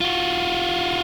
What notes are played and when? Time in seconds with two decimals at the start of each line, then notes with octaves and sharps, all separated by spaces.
0.01 F4 F#4